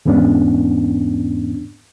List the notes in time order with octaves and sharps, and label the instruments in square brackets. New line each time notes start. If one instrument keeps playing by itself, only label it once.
[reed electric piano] E2 G#2 E3 B3 C#4 D4